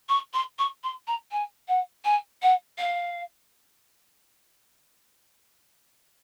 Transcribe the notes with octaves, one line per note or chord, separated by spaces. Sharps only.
C#6
C6
C#6
C6
A#5
G#5
F#5
G#5
F#5
F5